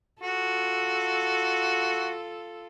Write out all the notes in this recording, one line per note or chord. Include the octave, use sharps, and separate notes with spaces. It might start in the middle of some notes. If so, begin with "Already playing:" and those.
F4 F#4 A4